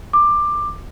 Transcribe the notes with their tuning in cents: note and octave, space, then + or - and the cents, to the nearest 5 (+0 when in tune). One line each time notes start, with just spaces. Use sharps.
D6 +15